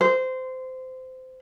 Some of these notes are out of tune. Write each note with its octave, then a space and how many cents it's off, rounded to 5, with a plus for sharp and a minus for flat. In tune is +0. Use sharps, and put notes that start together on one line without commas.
C5 -20